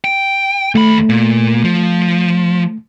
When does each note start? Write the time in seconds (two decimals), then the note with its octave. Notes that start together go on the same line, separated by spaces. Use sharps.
0.04 G5
0.75 D#2 A3 B5
1.09 A#2
1.64 F3